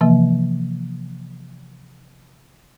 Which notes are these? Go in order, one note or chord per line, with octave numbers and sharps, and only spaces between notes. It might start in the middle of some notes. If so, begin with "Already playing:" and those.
C3 E3 F3 A#3